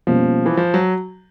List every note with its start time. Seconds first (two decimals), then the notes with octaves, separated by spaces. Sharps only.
0.07 B2 F3 G3 A#3 C#4
0.46 E3
0.57 F3
0.74 F#3